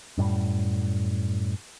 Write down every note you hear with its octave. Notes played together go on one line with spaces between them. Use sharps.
F#2 A2 G3